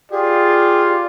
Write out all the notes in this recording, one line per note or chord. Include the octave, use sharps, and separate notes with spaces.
F4 G4 G#4 D5